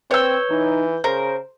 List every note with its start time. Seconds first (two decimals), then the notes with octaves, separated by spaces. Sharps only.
0.11 C4 B4 C#5 E6 G6 G7
0.51 E3 D#4
1.04 C#3 A#4 C5